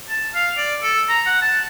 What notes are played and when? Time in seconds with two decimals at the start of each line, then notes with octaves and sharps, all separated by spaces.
0.09 A5
0.34 F5
0.58 D5
0.83 A4
1.09 A#5
1.26 F#5
1.42 A5